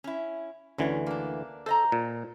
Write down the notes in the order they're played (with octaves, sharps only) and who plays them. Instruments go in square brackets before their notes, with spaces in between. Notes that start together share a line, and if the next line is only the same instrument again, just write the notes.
[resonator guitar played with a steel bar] C#4 E4
[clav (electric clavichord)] D2 D3 E3 [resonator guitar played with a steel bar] A3 C#4
[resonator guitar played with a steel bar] A#3 D4
[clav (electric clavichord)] A4 [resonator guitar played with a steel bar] C5 D#5 A#5
[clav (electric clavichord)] A#2